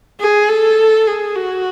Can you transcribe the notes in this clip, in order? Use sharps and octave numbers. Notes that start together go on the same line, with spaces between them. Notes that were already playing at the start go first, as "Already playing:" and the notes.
G#4
A4
G#4
F#4